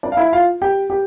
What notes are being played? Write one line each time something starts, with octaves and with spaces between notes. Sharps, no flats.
D4 D5
F5
E4 E5
F4 F5
G4 G5
G4 G5